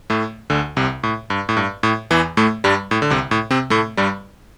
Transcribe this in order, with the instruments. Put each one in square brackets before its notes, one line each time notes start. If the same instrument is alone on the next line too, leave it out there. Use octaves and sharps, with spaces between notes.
[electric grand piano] A2 A3
D2 D3
C2 C3
A2
G2
A2
G2
A2
E2 E3
A2 A3
G2 G3
A2
D3
C2 C3
A2
C3 C4
A2 A3
G2 G3